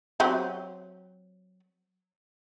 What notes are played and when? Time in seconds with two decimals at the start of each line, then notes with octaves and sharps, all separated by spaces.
0.20 F#3 C4 G4